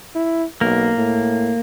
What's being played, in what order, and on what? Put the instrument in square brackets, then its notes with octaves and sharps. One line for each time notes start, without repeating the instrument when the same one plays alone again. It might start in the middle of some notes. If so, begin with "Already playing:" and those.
[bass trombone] E4
[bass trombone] B1 [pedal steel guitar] A#3
[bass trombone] A2